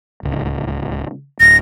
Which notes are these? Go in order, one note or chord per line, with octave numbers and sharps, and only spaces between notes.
D1 C#2
D1 A#6